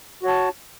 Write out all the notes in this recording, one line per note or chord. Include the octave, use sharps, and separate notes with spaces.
F#4 C#5 A5